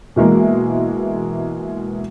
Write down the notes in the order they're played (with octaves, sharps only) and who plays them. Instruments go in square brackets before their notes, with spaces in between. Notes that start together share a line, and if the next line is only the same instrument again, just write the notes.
[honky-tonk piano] B2 E3 G#3 A#3